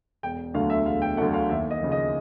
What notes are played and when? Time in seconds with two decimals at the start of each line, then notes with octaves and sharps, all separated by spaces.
0.23 E1 G5
0.54 D2 D3 F#3 A3 F5
0.70 E5
0.86 E1 F5
1.02 G5
1.17 D2 D3 F#3 A3 F#5
1.34 F5
1.49 D#2 E5
1.71 D#5
1.82 C#3 F3
1.92 D#5